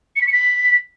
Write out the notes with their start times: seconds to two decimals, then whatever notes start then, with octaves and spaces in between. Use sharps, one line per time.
0.16 C#7
0.22 B6
0.27 C#7
0.33 B6